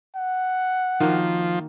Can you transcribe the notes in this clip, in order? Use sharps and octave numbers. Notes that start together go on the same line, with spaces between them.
F#5
D#3 F3 A#3 F#4